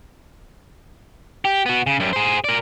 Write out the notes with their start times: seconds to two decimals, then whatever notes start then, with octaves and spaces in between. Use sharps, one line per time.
1.45 G4
1.66 B3 F#4
1.87 C#3
2.00 F#2 G3
2.13 G#4 C5
2.44 A#4 D5